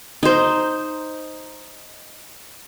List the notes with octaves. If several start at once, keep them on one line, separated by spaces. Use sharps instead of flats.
D#4 C5